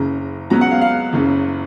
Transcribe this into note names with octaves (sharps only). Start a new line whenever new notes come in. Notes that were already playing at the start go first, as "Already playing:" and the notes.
Already playing: F#1 F#2 C#3 A#5
C#2 C#3 F#3 B3 A#5
F#5
F5
F5
F#1 F#2 C#3